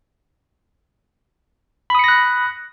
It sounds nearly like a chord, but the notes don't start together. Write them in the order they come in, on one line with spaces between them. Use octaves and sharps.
B5 D#6 C#7 A#6 F#6